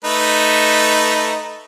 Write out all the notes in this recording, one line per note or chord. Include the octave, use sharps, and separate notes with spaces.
A3 D#4 B4